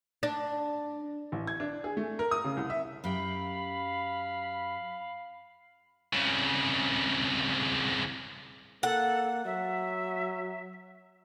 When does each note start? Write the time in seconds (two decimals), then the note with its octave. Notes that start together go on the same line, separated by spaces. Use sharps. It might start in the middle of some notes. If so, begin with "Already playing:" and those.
0.23 D4
1.32 A1
1.47 G#6
1.60 D4
1.84 G#4
1.97 A3
2.19 A#4
2.31 D#6
2.44 C#3
2.57 C2
2.70 E5
3.04 F#2 G4 F5 G5 B5
6.13 C2 C#3
8.83 A#3 A4 F#5
9.45 F#3 E5